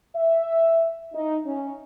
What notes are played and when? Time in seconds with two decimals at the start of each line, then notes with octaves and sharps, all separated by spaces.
0.15 E5
1.13 D#4
1.45 C#4